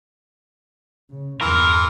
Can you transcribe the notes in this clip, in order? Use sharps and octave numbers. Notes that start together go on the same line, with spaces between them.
C#3
E2 G2 E3 A#4 C6